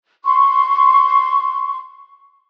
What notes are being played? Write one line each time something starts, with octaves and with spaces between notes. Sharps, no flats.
C6 C#6